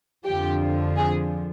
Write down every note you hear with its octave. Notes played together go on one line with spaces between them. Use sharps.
F2 D3 F3 G4
G#4